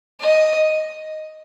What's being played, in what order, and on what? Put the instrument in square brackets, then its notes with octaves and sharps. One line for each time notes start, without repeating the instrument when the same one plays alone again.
[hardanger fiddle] D#5